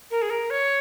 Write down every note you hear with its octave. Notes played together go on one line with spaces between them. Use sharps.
A#4
G#4
A#4
C#5